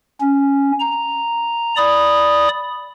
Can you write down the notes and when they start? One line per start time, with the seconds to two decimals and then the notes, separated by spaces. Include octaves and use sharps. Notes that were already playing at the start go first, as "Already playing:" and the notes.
0.21 C#4
0.79 A#5
1.77 D5 B5 D#6